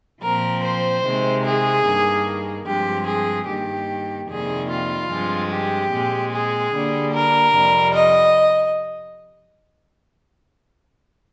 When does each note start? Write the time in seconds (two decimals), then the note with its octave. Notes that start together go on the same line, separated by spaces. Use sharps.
0.22 A#2 F3 C4 A#4
0.63 C5
1.04 C3 D#3 G#3 C4
1.44 G#4
1.85 G2 D#3 A#3
2.66 G2 F3 G#3 C4 G4
3.07 G#4
3.47 G2 D#3 A#3 G4
4.29 F2 C3 D#3 G3 A#3 G#4
4.69 F4
5.10 G2 F3 G#3 C4
5.51 G4
5.91 A#2 G#3 C4
6.32 G#4
6.73 D3 G3 A#3
7.13 A#4
7.54 F2 C3 G3
7.95 D#5